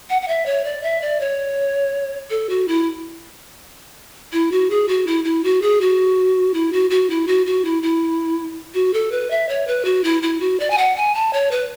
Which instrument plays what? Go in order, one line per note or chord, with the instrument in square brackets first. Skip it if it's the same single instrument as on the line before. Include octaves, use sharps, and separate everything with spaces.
[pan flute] F#5
F#5
E5
C#5
D5
E5
D5
C#5
A4
F#4
E4
E4
F#4
G#4
F#4
E4
E4
F#4
G#4
F#4
E4
F#4
F#4
E4
F#4
F#4
E4
E4
F#4
A4
B4
E5
C#5
B4
F#4
E4
E4
F#4
D5
G#5
F#5
G#5
A5
C#5
B4